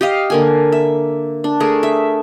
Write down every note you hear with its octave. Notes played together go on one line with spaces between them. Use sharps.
G4 D#5 F5
D3 A#3 G#5
E5
D4
A3 G#4 A#4
E5